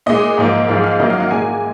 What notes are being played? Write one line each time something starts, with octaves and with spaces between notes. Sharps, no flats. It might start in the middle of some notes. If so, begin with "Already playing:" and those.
A#2 G#3 D#5
G#2 F3 A#3
G#2 F3 G#3 F5
F5
F#2 D#3 F#3 A#3 D#5
F5
F#5
A#2 G#3 G#5